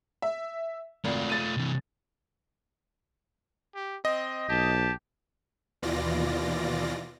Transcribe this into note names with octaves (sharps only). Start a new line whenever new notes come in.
E5
G#1 A3 F4
A6 D#7
C3 E3
G4
C4 D#5
B1 G4 A5
D#2 B2 E3 F4 D5 A#6